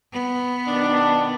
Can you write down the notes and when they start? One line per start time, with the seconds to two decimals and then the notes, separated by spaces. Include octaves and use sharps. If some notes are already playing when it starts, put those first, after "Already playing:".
0.13 B3
0.68 B2 D#3 D4